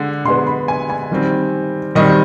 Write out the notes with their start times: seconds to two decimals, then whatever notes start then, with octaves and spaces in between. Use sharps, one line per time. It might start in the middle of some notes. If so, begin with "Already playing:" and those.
Already playing: D3 G#3
0.25 D3 G#3 B3 C6
0.47 B5
0.68 G#5
0.90 G#5
1.11 D#3 G3 C4
1.95 D#3 G3 C4 D#5